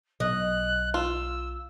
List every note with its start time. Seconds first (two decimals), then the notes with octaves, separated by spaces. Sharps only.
0.20 B1 D#5 F#6
0.94 F4 E6